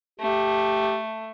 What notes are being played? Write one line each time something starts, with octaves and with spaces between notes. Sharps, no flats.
A3 G4